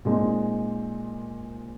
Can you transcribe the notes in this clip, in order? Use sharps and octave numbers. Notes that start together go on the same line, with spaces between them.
A#2 G#3 C4 D#4